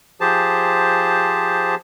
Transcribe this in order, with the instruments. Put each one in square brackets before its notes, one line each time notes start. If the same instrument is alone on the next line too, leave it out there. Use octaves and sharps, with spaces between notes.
[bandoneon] F3 G4 G#4 C5 A5